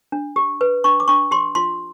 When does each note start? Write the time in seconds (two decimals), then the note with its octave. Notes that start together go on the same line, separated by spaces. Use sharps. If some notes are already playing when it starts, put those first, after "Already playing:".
0.12 D4
0.36 G4
0.61 B4
0.84 D4 C#6
1.00 D6
1.08 D4 C#6
1.31 G4 C6
1.55 F4 C6